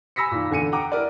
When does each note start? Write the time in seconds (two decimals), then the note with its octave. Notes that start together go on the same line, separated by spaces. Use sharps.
0.16 G#5 B5 E6 A#6 B6 C#7
0.31 A#2 D#3
0.50 E2 D3 G#5 C#7 D#7
0.72 F#5 G5 A#5 D6
0.92 E4 A#4 D5